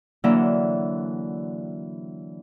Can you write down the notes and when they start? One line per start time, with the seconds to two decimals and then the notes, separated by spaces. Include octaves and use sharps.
0.24 D3 E3 F#3 A#3 F#4 E5